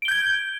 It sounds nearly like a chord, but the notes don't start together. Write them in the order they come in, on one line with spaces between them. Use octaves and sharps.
D7 G7 G6 G#6